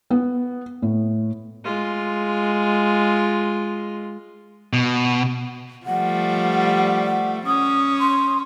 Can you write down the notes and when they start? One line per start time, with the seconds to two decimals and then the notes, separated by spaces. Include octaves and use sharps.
0.10 B3
0.82 A2
1.65 G#3 F4
4.73 B2
5.86 F3 G3 A3 F#5
7.05 F#5
7.46 C#4 D#6
8.00 C6